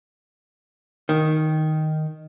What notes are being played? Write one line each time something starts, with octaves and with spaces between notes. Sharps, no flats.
D#3